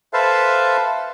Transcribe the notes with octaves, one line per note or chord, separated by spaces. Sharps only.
A4 B4 C5 E5 F5 A5